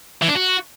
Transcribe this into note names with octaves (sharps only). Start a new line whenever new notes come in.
E3
D4
F#4